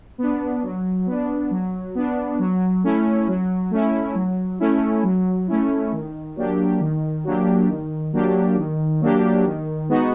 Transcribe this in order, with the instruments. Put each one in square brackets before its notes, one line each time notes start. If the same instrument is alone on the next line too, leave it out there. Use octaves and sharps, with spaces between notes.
[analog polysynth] B3 D4
F#3
B3 D4
F#3
B3 D4
F#3
A3 C#4 E4
F#3
A3 C#4 E4
F#3
A3 C#4 E4
F#3
A3 C#4 E4
D#3
F#3 A#3 D4 G4
D#3
F#3 A#3 D4 G4
D#3
F#3 A#3 D4 G4
D#3
F#3 A#3 D4 G4
D#3
G#3 B3 D#4 F#4